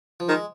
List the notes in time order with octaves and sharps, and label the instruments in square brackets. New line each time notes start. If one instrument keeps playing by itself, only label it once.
[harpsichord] F3
[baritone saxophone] D#3 [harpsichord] G#3